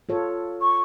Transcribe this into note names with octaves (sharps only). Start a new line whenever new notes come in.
F4 A4 C#5
C#6